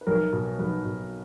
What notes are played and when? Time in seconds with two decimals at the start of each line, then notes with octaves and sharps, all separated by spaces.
0.01 B4
0.07 B1 A#4
0.33 B2
0.59 B1 B4
0.85 B2